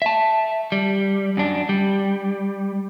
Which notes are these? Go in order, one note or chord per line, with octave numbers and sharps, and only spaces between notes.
E5 A5
G3
F#2 D4
G3